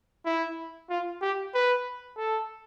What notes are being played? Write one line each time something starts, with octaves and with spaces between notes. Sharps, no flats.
E4
F4
G4
B4
A4